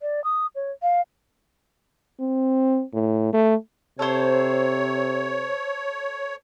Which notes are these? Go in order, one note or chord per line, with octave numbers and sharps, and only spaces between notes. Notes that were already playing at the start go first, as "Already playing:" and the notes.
D5
D#6
C#5
F5
C4
A2
A3
C3 A4 C5 C#5